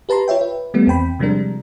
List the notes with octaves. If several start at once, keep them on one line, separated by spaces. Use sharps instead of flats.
G4 B4 A5 A#5 C6
F4 C#5 E5 G5
B4
D#3 G3 A3 B3
E2 C4 G5 B5
C3 F3 G3 G#3 D4 A#4